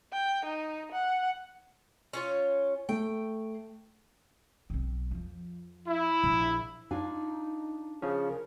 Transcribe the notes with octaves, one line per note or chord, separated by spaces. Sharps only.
G5
D#4
F#5
C#4 F4 C#5
A3 G5
B1 C4
F2 F3
E4
A#1
D4 D#4 F4 G#5
C#3 F3 C#4 G#4
A#4